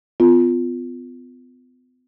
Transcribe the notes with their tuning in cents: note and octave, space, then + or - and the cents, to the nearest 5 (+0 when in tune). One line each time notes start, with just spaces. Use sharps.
B3 +40 F4 +0